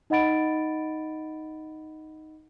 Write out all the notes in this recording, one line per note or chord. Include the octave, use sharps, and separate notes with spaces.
D#4 D#5 F#5 B5 A6 D7